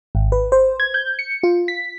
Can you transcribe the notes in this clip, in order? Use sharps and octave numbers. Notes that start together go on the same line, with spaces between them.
G#1
B4
C5
G#6
G6
C#7
F4
B6